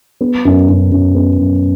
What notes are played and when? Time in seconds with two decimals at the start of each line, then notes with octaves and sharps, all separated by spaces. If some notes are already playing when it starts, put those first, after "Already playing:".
0.21 B3
0.45 F#2
0.69 F#2
0.92 F#2
1.15 B3
1.38 F#2